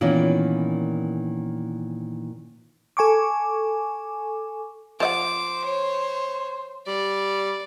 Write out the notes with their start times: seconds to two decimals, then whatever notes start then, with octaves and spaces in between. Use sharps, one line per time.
0.01 A#2 D#3 E3 B3 C#4
2.97 A4 G#5 C#6 D6
5.00 F3 C5 D#5 F#5 D6
5.65 C#5
6.87 G3 D5